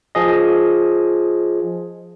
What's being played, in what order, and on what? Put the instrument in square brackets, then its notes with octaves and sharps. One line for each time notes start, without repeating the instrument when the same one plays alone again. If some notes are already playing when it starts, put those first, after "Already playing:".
[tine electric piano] F3 G#4 D#5